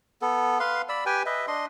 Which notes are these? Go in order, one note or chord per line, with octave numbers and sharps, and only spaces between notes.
B3 A4
B4 F5 C6
D5 B5 E6
G4 B4 G5 G#5
B4 D#5 E5
D4 D#5 C6